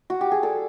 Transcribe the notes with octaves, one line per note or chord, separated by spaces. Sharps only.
F#4
G4
G#4
G3 A4